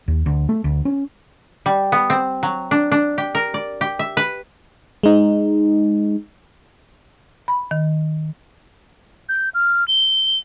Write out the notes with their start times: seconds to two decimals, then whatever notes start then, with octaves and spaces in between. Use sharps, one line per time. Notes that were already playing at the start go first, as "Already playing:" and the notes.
0.08 D#2
0.26 D2
0.49 A3
0.64 D2
0.85 C#4
1.66 G3
1.92 B3
2.10 C4
2.43 F#3
2.71 D4
2.92 D4
3.18 G4
3.35 A#4
3.54 D5
3.81 G4
3.99 E5
4.17 B4
5.03 G#3 D#4
7.48 B5
7.71 D#3
9.29 G6
9.54 F6
9.88 G7